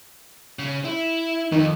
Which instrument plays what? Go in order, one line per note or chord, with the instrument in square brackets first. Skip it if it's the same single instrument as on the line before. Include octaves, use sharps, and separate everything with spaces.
[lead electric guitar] C#3
E4
[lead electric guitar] F2 [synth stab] D#3